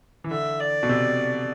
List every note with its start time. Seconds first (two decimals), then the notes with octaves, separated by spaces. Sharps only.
0.24 E3
0.31 D3 E5
0.59 D5
0.83 B2
0.89 C3